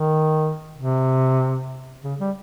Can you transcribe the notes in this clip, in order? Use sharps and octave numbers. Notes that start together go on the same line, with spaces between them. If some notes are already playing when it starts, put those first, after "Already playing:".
Already playing: D#3
C3
C#3
G3